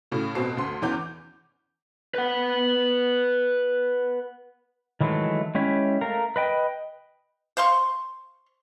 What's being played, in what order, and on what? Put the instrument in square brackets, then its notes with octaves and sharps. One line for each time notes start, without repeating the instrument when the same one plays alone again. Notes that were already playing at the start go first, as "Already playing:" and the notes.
[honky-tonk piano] A2 C#3 F#4
F1 B2 C4 C7
D2 C6
E2 E3 C#4 D6 G6
[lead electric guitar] B4 F#5
[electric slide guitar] D#3 E3 F#3 G#3 A3
G#3 C#4 E4 G4 C#5 E5
A3 A#4 F5
B4 D#5 G5
[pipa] C5 F5 C6 C#6